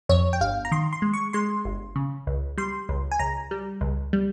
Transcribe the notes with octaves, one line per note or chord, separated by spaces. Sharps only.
F2 C#5
G5
G1 F5
A#5
D#3 C6
C6
G#3
C#6
G#3 C6
G1
C#3
C#2
G3 C6
C#2
G#5
C#2 A#5
G3
C#2
G3